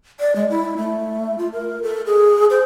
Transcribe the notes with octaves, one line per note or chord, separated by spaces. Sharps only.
D5
G#3
E4
A3
F4
A#4
A4
G#4
C5